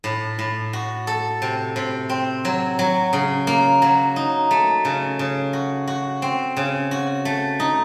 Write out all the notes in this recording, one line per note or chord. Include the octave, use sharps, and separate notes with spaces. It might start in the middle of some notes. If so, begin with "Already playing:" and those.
A2
A2
F#4
A4
C3
C3
C4
F#3
F#3
C#3
A#3
F#3
D#4
A3
C#3
C#3
F#4
F#4
C4
C#3
F#4
A3
D#4